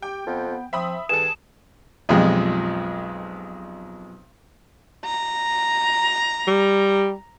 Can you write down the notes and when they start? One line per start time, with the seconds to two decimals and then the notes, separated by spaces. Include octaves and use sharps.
0.02 G4 G5
0.27 F2 B3
0.50 B3
0.73 F3 C4 E5 B5 D#6
1.09 G2 D#3 G#4 A4 E7
2.09 B1 F2 F3 G3 G#3
5.06 A#5
6.47 G3